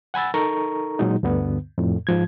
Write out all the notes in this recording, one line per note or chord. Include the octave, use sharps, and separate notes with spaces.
F#5 G#5 B5 E6 A6
D#4 A4 A#4 A#5 C#6
A#2 F#3 G#3 D#4
D2 G2 D3 B3
F2 A2
G#2 F3 G#6